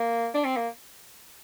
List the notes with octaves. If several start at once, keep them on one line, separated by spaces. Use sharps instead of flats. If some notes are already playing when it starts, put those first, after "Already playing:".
Already playing: A#3
D4
C4
A#3